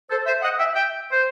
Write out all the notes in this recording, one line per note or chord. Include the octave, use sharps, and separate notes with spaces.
A4 C5
C5 E5
D#5 F#5
E5 G5
E5 G5
C5